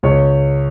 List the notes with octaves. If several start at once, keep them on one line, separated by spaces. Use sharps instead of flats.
C#2 C#5